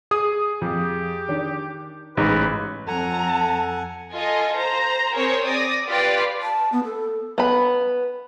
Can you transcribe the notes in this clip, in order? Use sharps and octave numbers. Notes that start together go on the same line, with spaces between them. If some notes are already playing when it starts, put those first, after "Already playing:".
G#4 D#6
F2 G4
D#3 D4
A1 G#2 C#3 D#4 B4
F2 A4 F#5 G#5 A#5
F4 A4 D#5 G#5
C5 A#5
C4 G#4 A#4 C5 C#5
D5 D#6 A#6
F4 G4 B4 D5
A5
B3
A4
B3 B5